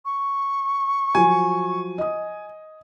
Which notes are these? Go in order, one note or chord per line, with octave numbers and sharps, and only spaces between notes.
C#6
F3 F#3 G#5
D#5 D#6